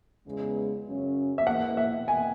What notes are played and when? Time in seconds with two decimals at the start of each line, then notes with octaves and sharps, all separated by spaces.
0.25 E2 C#3 G#3 B3
0.85 F#2 C#3 F#3 C#4
1.38 E5
1.46 G#2 E3 A#3 F#5
1.77 E5
2.08 G#5